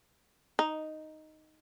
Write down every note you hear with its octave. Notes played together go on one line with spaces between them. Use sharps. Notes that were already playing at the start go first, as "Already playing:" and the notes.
D#4